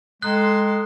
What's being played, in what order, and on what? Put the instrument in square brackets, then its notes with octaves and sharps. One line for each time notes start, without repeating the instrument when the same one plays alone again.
[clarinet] G#3 [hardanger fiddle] A4 C6 [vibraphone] G5 A#5 D#6 [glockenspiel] F#6